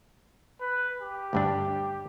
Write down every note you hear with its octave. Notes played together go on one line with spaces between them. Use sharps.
B4
G4
D2 G2 D4